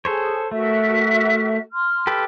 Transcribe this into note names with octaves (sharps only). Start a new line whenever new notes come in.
G#4 A4 C5 C#5
A3 F#4 A#4 E5
C6 F6
G4 A4 B4